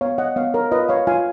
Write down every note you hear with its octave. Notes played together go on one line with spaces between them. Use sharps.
B3 C#5 F5
D#5 F#5
B3 C#5 F5
A#4 C#5
F4 B4 D#5
C#5 F5
F4 F5 G#5